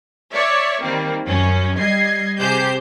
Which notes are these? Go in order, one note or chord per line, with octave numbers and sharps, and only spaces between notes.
C#5 D5 E5
D#3 G3 A#3 C4
F#2 C#4
G3 D#5 G#6 C7
C3 G4 G#4 C5 G6